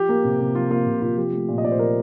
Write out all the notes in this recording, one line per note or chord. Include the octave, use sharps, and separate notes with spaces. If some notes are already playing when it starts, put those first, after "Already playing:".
Already playing: F3 G4
A#3
C3
C3
F3 F4
A#3 F4
C3
C3 F4
F3 G4
A3
A#2
D#5
A#2 D5
C5
F3 A#4